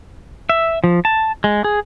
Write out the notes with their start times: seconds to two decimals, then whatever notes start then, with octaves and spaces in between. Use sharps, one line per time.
0.49 E5
0.84 F3
1.05 A5
1.44 G#3
1.64 G#4